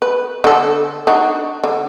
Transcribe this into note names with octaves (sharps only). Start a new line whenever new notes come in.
B4
D3 A4
D4 D#4 F#4
D3